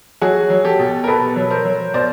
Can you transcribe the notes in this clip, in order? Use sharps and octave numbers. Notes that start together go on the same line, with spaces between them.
F#3 F#4 G#4
F#3
G4 A4
B2
A#4
B2 A4 B4
F#3
A#4 C5
F#3
B2 C5 D5